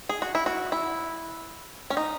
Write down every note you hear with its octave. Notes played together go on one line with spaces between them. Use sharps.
G#4
F#4
E4
F#4
E4
C#4
D#4